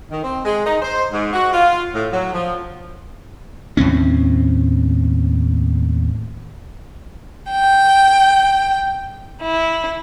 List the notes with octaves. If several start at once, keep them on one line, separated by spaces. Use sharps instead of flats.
D#3
C4
G#3
D#4
C5
G#2
F#4
F4
A2
F#3
F3
D#2 A2 C4 C#4
G5
E4